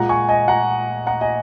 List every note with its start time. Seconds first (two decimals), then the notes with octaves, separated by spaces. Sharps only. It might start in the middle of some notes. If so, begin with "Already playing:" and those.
Already playing: A#2 G#3 F#5 A#5
0.09 G#5 C#6
0.29 D#5 G#5
0.48 F#5 A#5
1.07 F#5 A#5
1.21 D#5 G#5